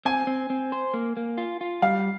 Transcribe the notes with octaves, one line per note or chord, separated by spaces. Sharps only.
C4 G#5
C4
C4
C5
A#3
A#3
F4
F4
G3 F5